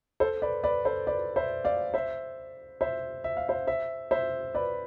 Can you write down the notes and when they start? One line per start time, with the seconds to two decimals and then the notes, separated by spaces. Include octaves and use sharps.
0.20 A4 C5
0.42 B4 D5
0.63 B4 D5
0.85 A4 C5
1.07 B4 D5
1.36 C5 E5
1.64 D5 F5
1.94 C5 E5
2.81 C5 E5
3.24 E5
3.37 F5
3.48 C5 E5
3.67 C5 E5
4.11 C5 E5
4.55 B4 D5